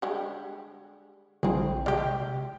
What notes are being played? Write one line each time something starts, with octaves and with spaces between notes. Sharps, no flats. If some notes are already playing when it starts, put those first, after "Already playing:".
D3 G3 G#3 F#5 G5
A#1 D3 G3 C4 E4 G#4
C3 G#3 G4 D5 F6